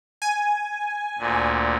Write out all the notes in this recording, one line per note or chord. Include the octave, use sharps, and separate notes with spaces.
G#5
D2 A#2